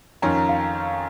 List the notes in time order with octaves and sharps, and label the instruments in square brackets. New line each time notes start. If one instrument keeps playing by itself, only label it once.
[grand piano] F2 D#3 C#4 F4 A#4 [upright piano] A#5
[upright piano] F5